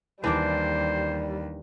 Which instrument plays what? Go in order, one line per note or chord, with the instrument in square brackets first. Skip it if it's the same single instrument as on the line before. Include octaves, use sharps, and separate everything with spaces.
[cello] D#2 [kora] E3 D4 D5 [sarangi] G3 [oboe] C5